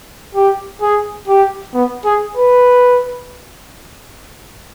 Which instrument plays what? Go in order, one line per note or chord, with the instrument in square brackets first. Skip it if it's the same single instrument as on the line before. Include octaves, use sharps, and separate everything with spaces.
[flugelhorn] G4
G#4
G4
B3
G#4
B4